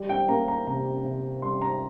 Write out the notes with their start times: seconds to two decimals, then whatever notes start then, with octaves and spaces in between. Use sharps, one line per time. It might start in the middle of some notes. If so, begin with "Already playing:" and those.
Already playing: G3
0.09 G5
0.28 A#3 A#5
0.48 A#5
0.67 C3 A#5
1.05 C3
1.42 G3 C6
1.62 A#5